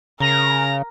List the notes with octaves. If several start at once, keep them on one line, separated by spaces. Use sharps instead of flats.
C#3 A#4 A#5